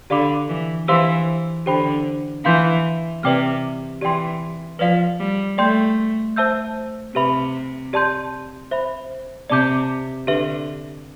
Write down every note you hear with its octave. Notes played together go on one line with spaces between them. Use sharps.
D3 G4 D5 F5 B5 D6
E3
E3 G4 C5 F5 C6 E6
D3 G4 C5 G5 B5
E3 F5 C6 G6
C3 B4 D5 G5 D6 F6
E3 G4 D5 G5 C6
F3 B4 D5 F5
G3
A3 D5 G5 C6 G6
C5 E5 A5 E6 G6
C3 G4 B4 E5 B5
G4 D5 A5 C6 G6
C5 E5 B5
C3 D5 A5 D6 G6
D3 G4 B4 E5